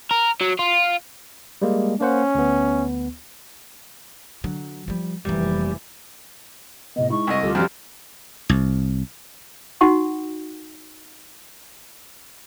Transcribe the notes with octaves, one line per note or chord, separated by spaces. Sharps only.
A#4
F#3
F4
G3 G#3 A#3
A#3 C#4 C5 F#5
D2 B3
D3 F#3
F3 G3
F1 F2 E3 G3 A#3
A2 C3 B3 D#5
G#3 D#4 E4 C#6
C2 D#5
D2 G3 F4 G4 A4
F2 C3 G3 C4 F#4 F6
C2
D#4 F#4 F#5 C#6